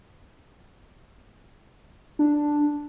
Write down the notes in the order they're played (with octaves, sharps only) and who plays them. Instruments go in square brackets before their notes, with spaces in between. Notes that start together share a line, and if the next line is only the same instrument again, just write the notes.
[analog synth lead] D4